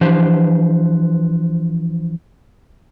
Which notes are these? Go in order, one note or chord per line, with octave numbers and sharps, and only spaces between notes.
E3 F3 D4 G4 B4 C5